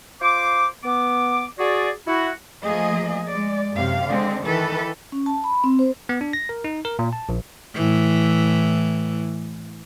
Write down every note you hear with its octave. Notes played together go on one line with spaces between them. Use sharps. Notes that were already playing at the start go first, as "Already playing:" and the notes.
F4 C5 C6 D6
B3 D6
F#4 G#4 D5
E4 F#4
F3 A3 A#3 G#4 D#5
G#3 D5
F#2 C3 F5
D3 G#3 C4
D#3 E3 A4 B4
C#4
A5
B5
C4
C5
B3
D4
A#6
A#4
D#4
A#4
A#2
A5
A#1
A2 E3